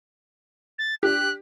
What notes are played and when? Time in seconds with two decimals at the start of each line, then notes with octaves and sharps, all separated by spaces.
0.79 A6
1.03 D4 G4 F#6